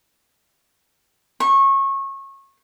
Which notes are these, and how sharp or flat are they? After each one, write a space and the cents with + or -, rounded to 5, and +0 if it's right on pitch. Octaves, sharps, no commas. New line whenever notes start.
C#6 -25